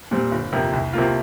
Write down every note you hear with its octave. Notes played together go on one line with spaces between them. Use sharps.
A#2 G3 C4
G1
F2 C3 A#3
C2
C3 A#3 F4